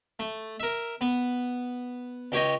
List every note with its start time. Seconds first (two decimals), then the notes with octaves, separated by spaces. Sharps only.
0.19 A3
0.60 A#4 E5
1.01 B3
2.32 C#2 G4 C#5 D#5